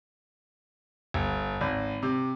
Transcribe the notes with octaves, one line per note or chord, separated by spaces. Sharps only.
G1
G#1
C3